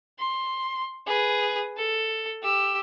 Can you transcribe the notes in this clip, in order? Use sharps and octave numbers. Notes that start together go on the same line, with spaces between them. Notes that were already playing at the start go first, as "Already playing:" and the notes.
C6
G#4 B4
A4
G4 E6